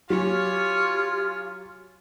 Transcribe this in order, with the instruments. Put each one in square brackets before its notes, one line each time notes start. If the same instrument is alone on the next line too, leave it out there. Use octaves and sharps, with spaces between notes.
[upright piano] F#3 [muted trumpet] F4 [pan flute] G4 [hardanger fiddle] C#5 G#5